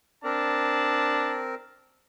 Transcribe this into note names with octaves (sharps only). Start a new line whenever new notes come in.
C4 D4 A#4 A5